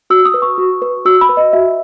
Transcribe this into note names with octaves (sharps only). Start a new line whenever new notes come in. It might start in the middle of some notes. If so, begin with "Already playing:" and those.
F#4 E6
D#6
B4
C#6
F#4
B4
F#4 E6
B5
B4
D#5
F#4 E5